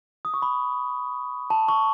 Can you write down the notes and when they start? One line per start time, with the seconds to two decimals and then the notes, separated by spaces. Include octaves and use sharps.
0.25 D#6
0.34 C#6
0.42 B5
1.50 A5
1.68 C#6